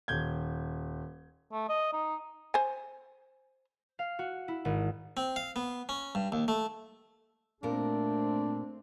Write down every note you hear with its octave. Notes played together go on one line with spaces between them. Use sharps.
D#1 G6 G#6
A3
D#5
D#4
C5 G#5
F5
F#4
E4
G#1
C4
F5
B3
C#4
G2
D#2
A3
A#2 A3 C4 D4 A#4